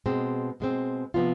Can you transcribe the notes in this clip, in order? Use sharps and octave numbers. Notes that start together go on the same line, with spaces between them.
B2 G#3 C4
B2 G#3 C4
C3 F3 B3 D4 F4